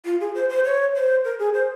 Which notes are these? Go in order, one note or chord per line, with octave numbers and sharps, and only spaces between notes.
F4
G#4
C5
C5
C#5
C5
A#4
G#4
C5